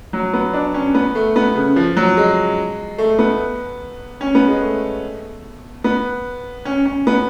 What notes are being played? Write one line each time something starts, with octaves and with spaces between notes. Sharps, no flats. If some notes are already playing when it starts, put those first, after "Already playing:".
F#3
B3
D4
C#4
B3
A3
B3
C#3
F3
F#3
G#3
A3
B3
C#4
B3
G#3
A3
B3
C#4
C#4
B3